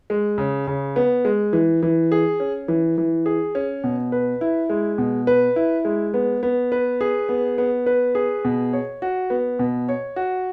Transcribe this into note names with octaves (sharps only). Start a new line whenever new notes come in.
G#3
C#3
C#3
B3
G#3
E3
E3
G#4
C#4
E3
E3
G#4
C#4
B2
B4
E4
G#3
B2
B4
E4
G#3
B3
B3
B4
G#4
B3
B3
B4
G#4
B2
C#5
F#4
B3
B2
C#5
F#4